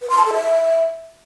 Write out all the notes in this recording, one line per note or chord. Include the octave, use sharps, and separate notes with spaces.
B4
C6
A5
A4
E5